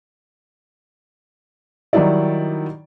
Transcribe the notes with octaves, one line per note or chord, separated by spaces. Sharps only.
D#3 F#3 G3 D#4 E4 D5